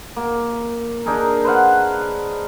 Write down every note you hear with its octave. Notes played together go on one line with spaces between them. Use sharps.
A#3
D4 D#4 G#4 A#4
B4 C5 F5 F#5